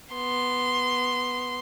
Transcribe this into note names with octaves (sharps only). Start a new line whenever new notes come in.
B3 C6